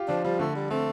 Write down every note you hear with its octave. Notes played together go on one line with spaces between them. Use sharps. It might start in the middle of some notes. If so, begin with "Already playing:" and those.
Already playing: F4 G4
F3 D4
F3 G3
D3 A3
G3
A3 C4